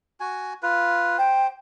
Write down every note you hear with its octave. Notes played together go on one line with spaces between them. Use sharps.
F#4 G#5
F4 B4
C5 G5